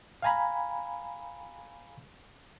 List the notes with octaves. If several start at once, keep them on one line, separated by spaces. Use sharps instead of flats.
F5 G5 G#5 A#5 B5